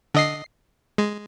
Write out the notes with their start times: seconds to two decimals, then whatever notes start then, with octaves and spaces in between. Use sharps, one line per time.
0.14 D3 D#5 C7
0.98 G#3